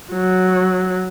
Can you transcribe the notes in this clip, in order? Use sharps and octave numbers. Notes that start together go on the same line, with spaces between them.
F#3